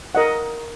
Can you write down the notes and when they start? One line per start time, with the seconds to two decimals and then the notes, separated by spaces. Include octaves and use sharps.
0.15 A#4 D#5 F#5